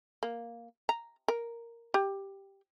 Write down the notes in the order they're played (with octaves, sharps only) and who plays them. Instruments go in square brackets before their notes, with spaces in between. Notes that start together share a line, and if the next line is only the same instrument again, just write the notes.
[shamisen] A#3
A#5
A#4
G4